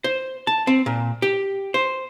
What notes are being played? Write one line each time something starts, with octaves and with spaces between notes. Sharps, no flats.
C5
A5
C4
A#2
G4
C5